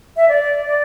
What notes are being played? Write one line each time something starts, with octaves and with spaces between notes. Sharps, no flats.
E5
D5
D5